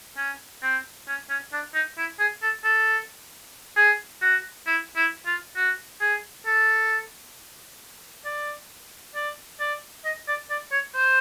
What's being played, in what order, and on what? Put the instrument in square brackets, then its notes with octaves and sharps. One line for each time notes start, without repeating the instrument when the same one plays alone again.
[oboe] C#4
C4
C#4
C#4
D4
D#4
E4
G#4
A4
A4
G#4
F#4
E4
E4
F4
F#4
G#4
A4
D5
D5
D5
D#5
D5
D5
C#5
C5